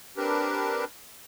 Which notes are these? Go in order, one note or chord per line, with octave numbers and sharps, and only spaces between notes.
C4 D4 G4 A#4 B4